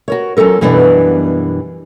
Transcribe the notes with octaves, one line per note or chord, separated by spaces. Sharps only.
F#4 A#4 C#5
F#3 C#4 F4 A4 A#4
F#2 B2 E3 G3 B3 D4